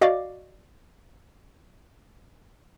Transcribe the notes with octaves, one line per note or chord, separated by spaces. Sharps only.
F#4 D5 D#5 F5 D6